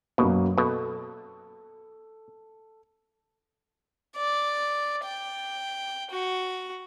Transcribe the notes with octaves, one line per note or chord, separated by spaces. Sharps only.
F#2 B2 F#3 A#3
B2 A4
D5
G5
F#4